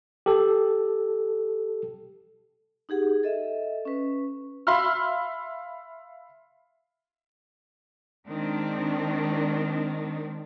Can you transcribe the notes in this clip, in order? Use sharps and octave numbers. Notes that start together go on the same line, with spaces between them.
G4 A4
D#4 G4 G#4 F#5
A4 D#5 E5
C#4 B4
E5 F5 B5 C6 E6 F6
D#3 G#3 C4 D4